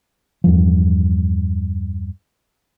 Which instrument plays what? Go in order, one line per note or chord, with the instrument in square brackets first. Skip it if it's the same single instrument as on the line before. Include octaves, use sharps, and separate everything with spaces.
[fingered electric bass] E2 G2 F3